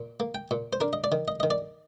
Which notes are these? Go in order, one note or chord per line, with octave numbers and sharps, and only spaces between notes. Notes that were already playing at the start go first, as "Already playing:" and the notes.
Already playing: A#2
A#3
G5
A#2
C5
D4 A#4
D#5
D5
D#3
D#5
D#3 D#5
D5